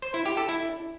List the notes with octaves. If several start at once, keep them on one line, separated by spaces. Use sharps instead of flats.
C5
E4
G4
A4
E4